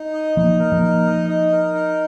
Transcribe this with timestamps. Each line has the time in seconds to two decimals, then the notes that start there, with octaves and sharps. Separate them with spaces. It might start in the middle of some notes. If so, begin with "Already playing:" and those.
Already playing: D#4
0.13 D#5
0.37 F3 A#3 D#4
0.59 A#4
0.72 F3 A#3
0.82 D#4
1.06 D#5
1.29 D#4
1.52 A#4
1.74 D#4